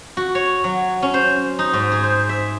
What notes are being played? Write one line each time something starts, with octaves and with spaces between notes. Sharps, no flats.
F#4
C#5
F#3
C#4
C5
D#4
G#2
G#4
C5
E5